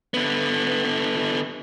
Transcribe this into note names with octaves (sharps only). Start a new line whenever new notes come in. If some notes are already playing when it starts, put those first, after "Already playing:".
D3 B3